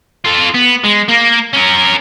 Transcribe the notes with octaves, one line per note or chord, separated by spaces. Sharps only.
F4 A4
B3
G#3
A#3
C#4 A#4